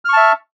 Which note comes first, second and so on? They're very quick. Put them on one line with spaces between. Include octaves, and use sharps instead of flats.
F6 C#6 A5 E5